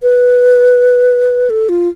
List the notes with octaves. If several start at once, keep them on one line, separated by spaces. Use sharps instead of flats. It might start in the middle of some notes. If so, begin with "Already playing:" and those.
B4
A4
F4